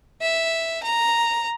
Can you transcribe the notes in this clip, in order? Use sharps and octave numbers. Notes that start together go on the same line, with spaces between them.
E5
A#5